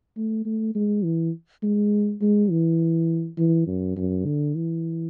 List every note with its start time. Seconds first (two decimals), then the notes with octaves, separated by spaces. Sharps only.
0.17 A3
0.45 A3
0.75 G#3
1.04 E3
1.63 G#3
2.21 G#3
2.51 E3
3.38 E3
3.67 F#2
3.97 F#2
4.26 D3
4.55 E3